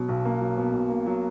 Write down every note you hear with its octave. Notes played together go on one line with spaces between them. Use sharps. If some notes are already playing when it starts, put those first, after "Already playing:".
Already playing: B2 F#3
B1
A#3
F#3
B2
B1
A#3
F#3